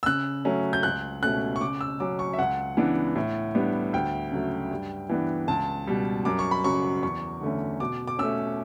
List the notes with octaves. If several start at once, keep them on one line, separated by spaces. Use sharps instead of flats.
E6
C#3 F#6
F#3 A3 C#4
G6
C#2 F#6
B2 A3 C#4 F#6
C#6
C#3 D6
E6
F#3 C#4 D6
C#6
E5
C#2 F#5
C#3 E3 B3 D4
A2
G3 B3 D4
D2 G5
C#3 F#3 A3
G2
E3 B3 D4
C#2 A5
B2 G3
F#2 D6
C#6
B5
C#3 F#3 C#6
E2 C#6
D3 A3 C#4
B2 D6
D6
A3 C#4 E6